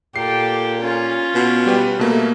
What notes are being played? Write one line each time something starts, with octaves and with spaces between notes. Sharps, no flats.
A#2 G4 A4 C7
C#4 F4
B2
G3 G4 B4
B2 A3 A#3